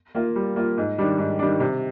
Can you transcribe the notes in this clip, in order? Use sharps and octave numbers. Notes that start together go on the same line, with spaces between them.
A#3 F4
G3
A#3 F4
G#2
D#3 G3 D4
G#2
D#3 G3 D4
C3